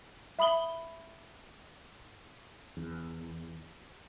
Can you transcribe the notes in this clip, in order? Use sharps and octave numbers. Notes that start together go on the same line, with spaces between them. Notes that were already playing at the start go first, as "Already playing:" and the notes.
E5 B5 D#6 F#7 G7
E2